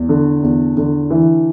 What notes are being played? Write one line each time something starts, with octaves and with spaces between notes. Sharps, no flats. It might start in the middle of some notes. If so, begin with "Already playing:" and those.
Already playing: E2
D3
E2
D3
E3